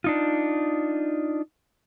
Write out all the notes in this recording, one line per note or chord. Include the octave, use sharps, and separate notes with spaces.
D4 D#4 F4